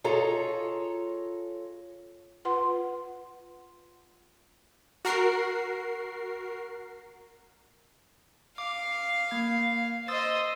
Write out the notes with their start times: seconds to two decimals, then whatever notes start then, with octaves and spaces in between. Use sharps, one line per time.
0.04 F4 G#4 A4 C#5 D#5 A#5
2.45 F4 B4 F#5 C6
5.05 F#4 A#4 C7
8.58 F5 D6
9.31 A#3 G#6
10.08 C5 D#5 D#6 E6 A6